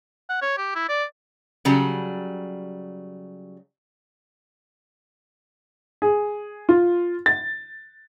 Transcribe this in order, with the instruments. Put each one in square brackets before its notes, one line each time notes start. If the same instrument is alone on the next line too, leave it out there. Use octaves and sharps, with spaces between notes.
[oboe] F#5
C#5
G4
E4
D5
[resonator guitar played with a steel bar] C#3 F#3 G3
[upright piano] G#4
F4
A6